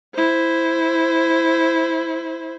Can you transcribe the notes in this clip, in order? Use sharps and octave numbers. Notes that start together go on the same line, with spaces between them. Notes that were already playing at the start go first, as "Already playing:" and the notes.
E4 C5